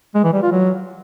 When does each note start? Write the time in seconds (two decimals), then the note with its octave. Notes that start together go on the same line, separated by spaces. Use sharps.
0.15 G#3
0.24 E3
0.33 G3
0.43 F4
0.52 F#3